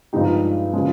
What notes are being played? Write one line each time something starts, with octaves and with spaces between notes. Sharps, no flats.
G2 F3 G#3 D#4 G4
C#3 F3 G#3